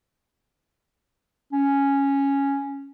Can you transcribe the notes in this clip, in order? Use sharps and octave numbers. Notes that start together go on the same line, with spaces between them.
C#4